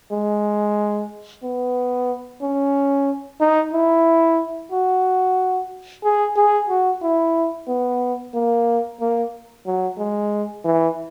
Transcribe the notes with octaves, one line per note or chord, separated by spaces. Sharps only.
G#3
B3
C#4
D#4
E4
F#4
G#4
G#4
F#4
E4
B3
A#3
A#3
F#3
G#3
E3